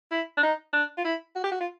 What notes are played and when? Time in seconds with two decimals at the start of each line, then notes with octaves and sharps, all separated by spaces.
0.11 E4
0.37 D4
0.43 D#4
0.73 D4
0.97 F4
1.05 E4
1.36 F#4
1.44 G4
1.52 F#4
1.60 F4